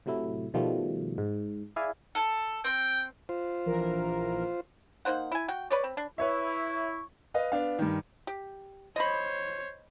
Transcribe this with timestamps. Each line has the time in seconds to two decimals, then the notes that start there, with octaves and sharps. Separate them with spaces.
0.06 A2 C3 F#3 A3 E4
0.54 B2 D#3 F3 G3 A3
1.18 G#2
1.76 E4 G#4 D5 E5 F5 G#5
2.15 A4
2.64 C4 G5
3.29 F4 C5
3.66 A#1 E3 A#4
5.05 A#3 D#4 C5 F#5
5.32 E4 G#5
5.48 F#4 G5
5.70 B4 C#5 D5
5.84 C4
5.97 D4
6.18 E4 B4 C#5 E5 C#6
7.34 B4 D#5 F5
7.52 B3 D4 F5
7.79 G2 D#3
8.27 G4
8.96 C5 C#5 D#5 B5